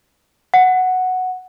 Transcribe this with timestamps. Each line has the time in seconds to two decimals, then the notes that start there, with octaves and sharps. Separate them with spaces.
0.54 F#5